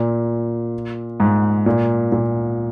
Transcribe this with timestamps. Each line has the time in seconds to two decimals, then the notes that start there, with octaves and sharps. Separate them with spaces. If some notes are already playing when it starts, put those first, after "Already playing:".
Already playing: A#2
1.20 G#2
1.66 A#2
2.12 A#2